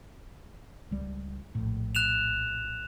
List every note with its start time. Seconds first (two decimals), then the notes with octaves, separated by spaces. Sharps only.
0.91 C#2 G3
1.55 A#1 A2
1.95 F#6 E7 F7